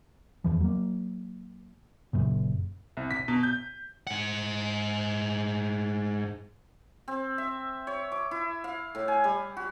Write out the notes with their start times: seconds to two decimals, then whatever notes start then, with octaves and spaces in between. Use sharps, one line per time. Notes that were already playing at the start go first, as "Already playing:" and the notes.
0.44 E2 E3 F3
0.61 F#3 A#3
2.13 F#1 F#2 A#2 C#3
2.97 C2
3.11 B6
3.28 B2
3.43 G6
4.07 G#2 F#5
7.08 C4
7.38 E5
7.87 C#5
8.12 D6
8.31 E4
8.64 F5
8.95 A2
9.08 G#5
9.24 G3
9.57 F#4